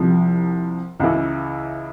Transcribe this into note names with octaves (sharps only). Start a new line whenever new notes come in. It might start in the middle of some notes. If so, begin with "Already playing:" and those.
Already playing: C2 C3 F3
C#2 C#3 E3